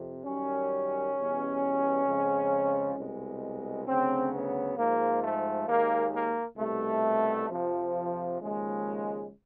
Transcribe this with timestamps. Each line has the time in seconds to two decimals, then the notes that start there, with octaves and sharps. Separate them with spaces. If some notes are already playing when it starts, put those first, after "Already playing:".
Already playing: F2 C3
0.24 F#2 D#3 G3 C#4
1.15 E2 B2 G3
2.05 F2 C#3 F3 G#3
2.96 C2 B2 G#3
3.86 D2 C#3 F#3 C4
4.32 B3
4.77 G#2 F3 G#3 A#3
5.22 A3
5.67 D#2 D#3 G#3 A#3
6.13 A#3
6.58 C2 B2 G3 A3
7.48 F2 C3 F3
8.39 D#2 C#3 F3 G#3